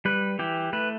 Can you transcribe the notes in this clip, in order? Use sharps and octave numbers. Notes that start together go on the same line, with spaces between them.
G3 B4
E3 G4
A3 B4